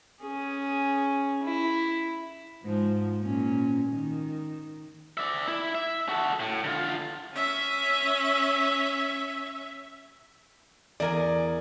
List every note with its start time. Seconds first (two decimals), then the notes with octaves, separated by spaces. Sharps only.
0.21 C#4 G#4
1.43 E4
2.63 G#2 F3
3.21 A#2 C#4
3.90 D#3
5.17 D5 E5
5.48 E4
5.75 E5
6.09 F#4 A4
6.40 A2
6.64 D3 F4
7.33 C#4 E5
11.00 E2 A#4 D5 G#5